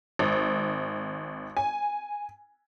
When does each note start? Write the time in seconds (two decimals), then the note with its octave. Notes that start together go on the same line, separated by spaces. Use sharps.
0.19 G#1
1.57 G#5